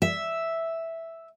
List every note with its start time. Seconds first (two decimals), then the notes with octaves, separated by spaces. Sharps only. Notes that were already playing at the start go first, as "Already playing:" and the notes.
0.02 E5